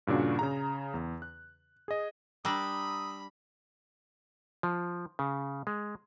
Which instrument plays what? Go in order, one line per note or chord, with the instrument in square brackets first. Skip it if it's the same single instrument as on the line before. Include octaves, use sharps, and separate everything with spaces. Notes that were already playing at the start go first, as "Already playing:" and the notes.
[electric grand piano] G2 A#2 C#3 D4 F#4
C#3 G#4 A#5
E2
F#6
G#4 D#5
[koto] G3 D4 [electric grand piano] A#5 E6 A#6 [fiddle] B5 [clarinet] D#6
[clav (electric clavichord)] F3
C#3
G#3